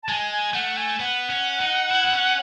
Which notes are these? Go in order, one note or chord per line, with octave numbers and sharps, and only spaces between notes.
A5
G#3 G#5
G#5
A3 F#5
G#5
B3 F#5
C#4
D#4
E4
B3
C#4